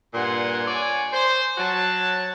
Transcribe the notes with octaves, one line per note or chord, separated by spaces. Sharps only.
G2 A#2 F#5 G#5 C6
C#5 D5 G#5
C5
F#3 F#4 C#5 A5